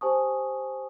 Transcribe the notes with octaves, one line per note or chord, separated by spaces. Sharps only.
G4 C5 G#5 A5 C#6 D#6